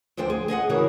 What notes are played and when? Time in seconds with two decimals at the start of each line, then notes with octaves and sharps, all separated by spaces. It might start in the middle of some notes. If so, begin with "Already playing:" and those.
0.17 D2 F3 D4 C5 G5
0.30 G#4
0.48 G#4 D#5 F5 F#5
0.69 C#3 E3 E4 F#4 G#4 A#4